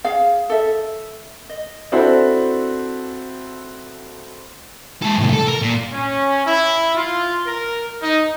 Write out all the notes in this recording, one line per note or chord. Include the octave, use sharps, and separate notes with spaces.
G#4 F5
A4 E5
D#5
C4 D4 E4 F#4 A4 C5
G#3 A4
C2 A2
A4
A#4
A#2
C#4
E4
F4
A#4
D#4